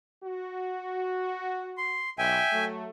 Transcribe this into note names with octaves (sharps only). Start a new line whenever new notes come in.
F#4
C6
B1 E5 G5 G#5
F#3 A3